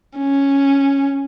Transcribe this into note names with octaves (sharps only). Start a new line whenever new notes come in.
C#4